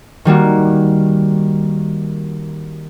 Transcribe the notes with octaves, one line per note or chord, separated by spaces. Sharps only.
D#3 G3 A#3 F#4